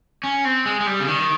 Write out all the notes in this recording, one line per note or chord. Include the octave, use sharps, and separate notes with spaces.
C#4
C4
G#3
G#3
G3
C#3
D#3